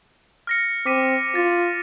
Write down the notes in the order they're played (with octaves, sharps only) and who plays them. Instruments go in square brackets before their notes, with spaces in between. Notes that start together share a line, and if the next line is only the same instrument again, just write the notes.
[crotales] F6 A#6 C#7
[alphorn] C4 [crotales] D6 B6 D#7
[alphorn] F4 [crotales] A6